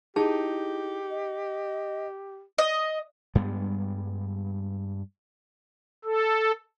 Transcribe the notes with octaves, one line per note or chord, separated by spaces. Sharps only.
D#4 E4 G4 G#4 A5
D#5
D#5
G2 G3 G#3 B3
A4